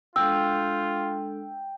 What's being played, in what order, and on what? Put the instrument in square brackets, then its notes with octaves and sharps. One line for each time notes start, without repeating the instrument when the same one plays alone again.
[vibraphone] G#3 D4 A4 [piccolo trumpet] F4 [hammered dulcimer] G5 [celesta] E6